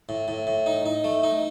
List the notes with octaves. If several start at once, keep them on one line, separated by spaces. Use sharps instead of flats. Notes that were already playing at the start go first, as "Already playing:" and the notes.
A2
A2
A2
D#4
D#4
A3
D#4